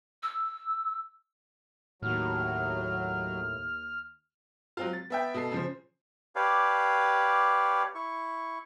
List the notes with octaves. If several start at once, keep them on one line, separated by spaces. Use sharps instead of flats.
E6
D#2 A2 F#3 F6
F#3 C4 F4
A6
B3 E5 G5
B2 A4 C7
C#3 F3 C5
G4 B4 C#5 D5 F5 A5
E4 C#6